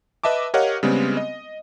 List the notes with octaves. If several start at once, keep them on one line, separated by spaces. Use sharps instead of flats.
B4 D#5 E5 A5 D6
G4 A#4 C#5 D#5 F5 F#5
C#3 G3 G#3 B3 C4
D#5